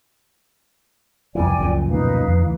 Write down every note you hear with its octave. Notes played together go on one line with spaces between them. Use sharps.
C2 F2 E3 D5 G5 G#5
C#2 F#2 A#2 F3
D2 B2 A#3 D#4 B4 F5
F2
D2 E3